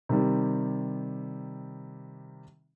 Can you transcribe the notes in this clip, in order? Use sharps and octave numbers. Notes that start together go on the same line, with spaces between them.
C3 D#3 G3